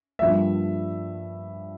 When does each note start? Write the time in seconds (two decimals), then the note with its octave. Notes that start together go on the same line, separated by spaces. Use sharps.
0.19 G2 F3 A#3 E5